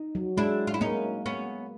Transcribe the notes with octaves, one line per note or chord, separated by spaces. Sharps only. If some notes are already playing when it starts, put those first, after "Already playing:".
Already playing: D#4
F#3
G#3 D4 E4
F4
E4
A#3 C#4 D#4
B3 C#4